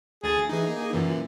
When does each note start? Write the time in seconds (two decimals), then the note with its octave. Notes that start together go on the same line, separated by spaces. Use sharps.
0.24 D2 G#4 A6
0.49 E3 D#4 G#4
0.67 A#3
0.93 F#2 A#2 E3